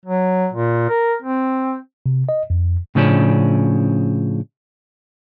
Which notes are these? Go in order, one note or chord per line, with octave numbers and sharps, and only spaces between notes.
F#3
A#2
A#4
C4
C3
D#5
F2
A2 C#3 F3 C#4 D4